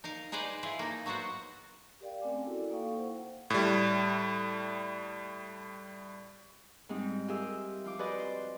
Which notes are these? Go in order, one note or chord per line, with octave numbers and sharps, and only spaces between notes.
D#4 A#4 F5
D#4 G#4 B4 C5 D5 D#5
E4 F4 G#4
A#3 D#4
F#3 B3 F#4 C5 F#5
G4 A#4 D5 F5 G5
A3 C4 C#4 G#5 D6
E4 F#4 A4 A#4 D5
A#3 D#4 A4 F5 G5 C#6
E4 C5 F#5
A2 G3
G#2 G3 C4 D#4
F4 G4 G#4 A#4 E5
F3 F4 D6
F#4 G#4 B4 C5 D5 D#5
C5